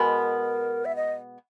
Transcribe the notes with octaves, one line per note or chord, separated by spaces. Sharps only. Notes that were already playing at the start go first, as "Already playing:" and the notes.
Already playing: B2 G#3 B3 A#4
E5
D#5